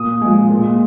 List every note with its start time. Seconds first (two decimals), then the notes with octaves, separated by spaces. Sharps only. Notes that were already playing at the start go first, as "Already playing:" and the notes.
Already playing: A#2 D#6
0.22 F3 G#3
0.50 A#2